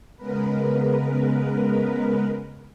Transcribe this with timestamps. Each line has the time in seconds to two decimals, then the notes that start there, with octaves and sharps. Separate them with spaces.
0.17 C#3 G#3 B3 A#4 B4